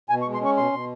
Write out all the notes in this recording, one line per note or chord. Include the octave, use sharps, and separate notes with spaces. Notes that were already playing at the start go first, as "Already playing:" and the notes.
B2 G#5
C#6
G#3
C6
C#4 C#6
B2 C6
B2